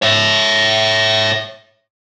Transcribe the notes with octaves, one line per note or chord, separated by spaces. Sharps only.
C#5 E5